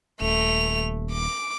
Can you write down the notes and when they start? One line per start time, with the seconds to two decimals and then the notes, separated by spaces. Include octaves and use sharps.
0.21 D#1 A3 F7
1.13 D6